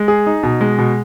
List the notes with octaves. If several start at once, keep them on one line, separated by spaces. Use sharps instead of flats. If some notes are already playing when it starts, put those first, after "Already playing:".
Already playing: G#3
G#4
D#4
B2
G#3
B2